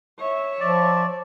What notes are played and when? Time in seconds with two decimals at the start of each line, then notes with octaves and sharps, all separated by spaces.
0.19 C#5 E5
0.60 F3 D5